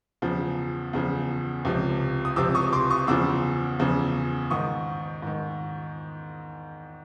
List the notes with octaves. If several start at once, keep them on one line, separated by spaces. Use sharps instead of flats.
E2 C#3 F3
E2 C#3 F3
C#2 C3 F3
D#6
C#2 C3 F3 D6 E6
C#6 D#6
C6 D6
C#6 D#6
E2 C#3 F3 D6 E6
E2 C#3 F3
G#2 D#3 C#6 D#6
G#2 D#3